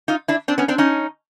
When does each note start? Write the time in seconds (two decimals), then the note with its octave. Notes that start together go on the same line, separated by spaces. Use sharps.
0.08 D#4 F4
0.28 D4 E4
0.48 C4 D4
0.58 B3 C#4
0.68 C4 D4
0.78 C#4 D#4